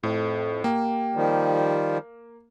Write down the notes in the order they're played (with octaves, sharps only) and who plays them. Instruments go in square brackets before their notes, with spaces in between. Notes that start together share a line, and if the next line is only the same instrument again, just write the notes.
[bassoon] F2 [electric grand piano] A2
[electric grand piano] A#3 [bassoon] G4
[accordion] D#3 F3 G3